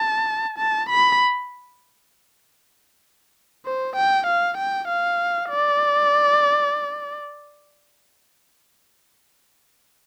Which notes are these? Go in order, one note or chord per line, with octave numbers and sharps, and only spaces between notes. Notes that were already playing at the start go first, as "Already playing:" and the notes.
Already playing: A5
A5
B5
C5
G5
F5
G5
F5
D5